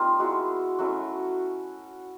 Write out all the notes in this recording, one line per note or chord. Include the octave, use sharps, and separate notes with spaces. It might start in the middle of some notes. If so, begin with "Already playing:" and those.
Already playing: G3 A#3 C4 D#4 F4
G#3 B3 E4 F#4
F#3 A3 C#4 E4 F#4